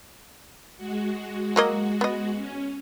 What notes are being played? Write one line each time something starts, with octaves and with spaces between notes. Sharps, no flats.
G#3 F#4
F#3 A#3 D#5
B3 D#5
C#4